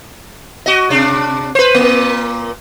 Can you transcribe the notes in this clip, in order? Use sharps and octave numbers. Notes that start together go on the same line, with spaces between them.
F#4 D#5
C3 D4
B4 C5
A#2 A#3